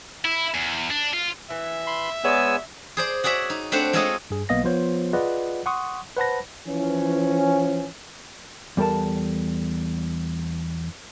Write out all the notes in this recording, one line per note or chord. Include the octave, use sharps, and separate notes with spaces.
E4
E2
D4
F4
E3 E5
B5 C6
G#3 B3 C#5 D5 G#5 E6
G#4 C5 D5
F#4 G#4 C#5 D5 E5
D#4
A3 C4 D4 C5 F#5
G#3 C4 F4 A4 C#5 D#5
G2 G#4
B1 A#3 B3 D#5 F5 A#6
F3 B3 F4 C5 C#5
F4 G#4 B4 D5 D#5 F#5
F#5 C6 C#6 D#6
B4 C5 F#5 A5 B5 A#6
E3 F3 C#4
E2 G3 A4 A#4 A5